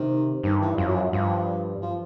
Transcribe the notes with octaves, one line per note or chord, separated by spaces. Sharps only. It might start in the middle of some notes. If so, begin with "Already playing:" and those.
Already playing: C3 D#3
G2 D#3
E3
F#2 F3
F#3
F3
G2 F3
F3